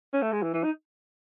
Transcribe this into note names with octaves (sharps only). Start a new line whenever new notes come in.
C#4
A3
G#3
E3
E3
D#4